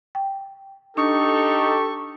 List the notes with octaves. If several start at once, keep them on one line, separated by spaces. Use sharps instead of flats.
G5
D4 D#4 G4 A4 C#6